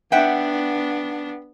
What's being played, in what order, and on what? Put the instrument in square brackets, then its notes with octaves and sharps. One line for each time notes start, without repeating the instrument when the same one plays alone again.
[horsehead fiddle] B3 D4 [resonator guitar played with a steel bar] E5 F#5 G5